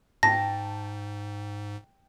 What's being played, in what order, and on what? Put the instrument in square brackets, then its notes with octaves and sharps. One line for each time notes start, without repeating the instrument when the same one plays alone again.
[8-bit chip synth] G#2 [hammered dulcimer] G5 [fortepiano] A5 [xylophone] A#6